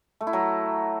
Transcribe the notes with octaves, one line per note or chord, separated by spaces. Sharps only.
A3
E4
F#3